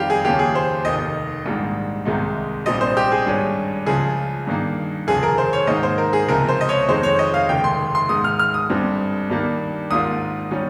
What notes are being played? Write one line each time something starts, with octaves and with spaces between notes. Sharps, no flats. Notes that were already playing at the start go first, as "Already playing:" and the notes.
Already playing: F2 D#3 G3 C4 F4 G4 F5
G#4
D#2 C#3 F3 A#3 C#4 G4
G#4
C5
F1 D#2 D#3 D#5
A#1 G#2 D#3 G3 A#3
C2 C3 D#3 G#3 D#4
A#1 A#2 G3 C4 D#5
C5
G4
G#4
G#1 G2 G3 C#4
C#2 C#3 F3 G#4
G2 D#3 A#3
F1 D#2 C#3 F3 G#4
A#4
C5
C#5
G#2 D#3 A#3 D#5
C5
A#4
G#4
C#2 C3 F3 A#4
C5
D#5
C#5
F2 D#3 G#3 C5
C#5
D#5
F5
F1 D#2 C#3 G#3 G5
C6
C6
G#2 D#3 G#3 D#6
F6
F6
D#6
G1 G2 G3 C4
G2 D#3 G3 A#3
G#1 G#2 D#3 A#3 F4 D#6
D#3 G3 C#4